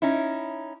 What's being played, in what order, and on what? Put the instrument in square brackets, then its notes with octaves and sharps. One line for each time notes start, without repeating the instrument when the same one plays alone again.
[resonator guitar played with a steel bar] C#4 D#4 E4